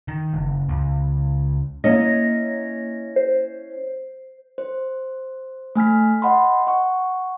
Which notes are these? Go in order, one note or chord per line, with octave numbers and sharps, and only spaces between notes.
D#3
F#1
C#2
A#3 C#4 E4 C#5 D#5 A#6
C5
C5
A3 G#5 F6 B6
D#5 F#5 B5 C6
F#5 C#6